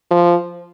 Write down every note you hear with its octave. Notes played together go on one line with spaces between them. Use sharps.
F3